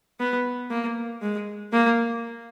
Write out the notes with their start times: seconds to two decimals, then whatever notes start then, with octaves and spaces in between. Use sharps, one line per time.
0.20 B3
0.70 A#3
1.22 G#3
1.72 A#3